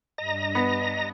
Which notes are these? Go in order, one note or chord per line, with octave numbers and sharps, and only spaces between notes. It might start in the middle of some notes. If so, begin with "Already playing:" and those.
G2 D4 D#5 A#5 A#6
B3